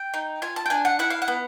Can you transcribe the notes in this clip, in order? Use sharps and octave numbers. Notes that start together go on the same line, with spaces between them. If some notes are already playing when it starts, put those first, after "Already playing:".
Already playing: G5
D#4
F4 G#5
A5
G5
D4 G#5
F#5
E4 F#5
F5
F#5
B3